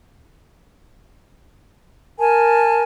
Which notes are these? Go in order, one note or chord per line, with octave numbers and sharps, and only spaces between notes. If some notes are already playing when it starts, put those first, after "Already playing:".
A#4 G#5 A5